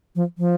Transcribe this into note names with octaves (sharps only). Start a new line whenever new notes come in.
F3
F3